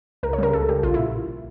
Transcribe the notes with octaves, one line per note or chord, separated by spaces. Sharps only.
C#2 A#4
C#5
C#3 G3 A#4
C#2 A4
C#3 G3 G4
A#1 F4
E4
A#2